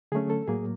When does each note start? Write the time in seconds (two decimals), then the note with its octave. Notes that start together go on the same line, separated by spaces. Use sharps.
0.12 D3 F#3 A3 C#4 G#4
0.30 A4
0.48 A2 F#3 A#3 G#4